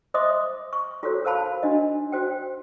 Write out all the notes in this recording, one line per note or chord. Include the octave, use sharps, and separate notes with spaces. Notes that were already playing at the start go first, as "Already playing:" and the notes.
C5 D#5 E5 C6 D6 D#6
C#6
F4 F#4 A4 A#4 C5 C#5
A#4 C5 F5 A5 B5
D4 F#4 D#5
F#4 C5 G5